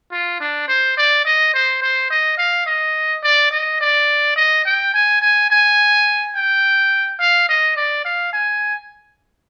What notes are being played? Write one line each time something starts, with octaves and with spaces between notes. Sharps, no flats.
F4
D4
C5
D5
D#5
C5
C5
D#5
F5
D#5
D5
D#5
D5
D#5
G5
G#5
G#5
G#5
G5
F5
D#5
D5
F5
G#5